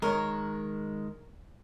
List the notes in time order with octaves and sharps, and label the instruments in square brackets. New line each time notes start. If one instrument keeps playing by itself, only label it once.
[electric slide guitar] D#3 G#3 [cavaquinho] A#4 C#5